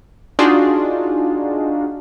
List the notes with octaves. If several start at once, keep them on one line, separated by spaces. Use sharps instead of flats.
D4 D#4 F4 F#4 G#4